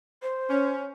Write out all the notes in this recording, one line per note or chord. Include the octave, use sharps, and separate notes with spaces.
C5
C#4